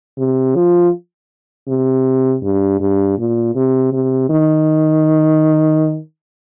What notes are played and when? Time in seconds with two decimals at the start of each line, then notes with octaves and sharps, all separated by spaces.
0.18 C3
0.55 F3
1.68 C3
2.43 G2
2.81 G2
3.18 A#2
3.56 C3
3.93 C3
4.30 D#3